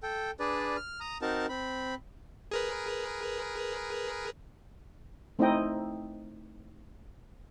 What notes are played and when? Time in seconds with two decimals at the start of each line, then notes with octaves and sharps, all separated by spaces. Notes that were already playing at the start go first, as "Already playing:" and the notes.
0.03 A4 G5
0.40 D4 G#4 B4 D5
0.77 F6
1.00 A#5 D#6
1.22 C4 D#4 F#4 A#4 A5
1.49 C4 B5
2.51 G#4 A#4 B4
5.39 A3 C4 D#4 E4 D#5 G5